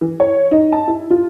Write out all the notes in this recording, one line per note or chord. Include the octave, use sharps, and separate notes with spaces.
E3
C#5
D#4
A5
E4
F4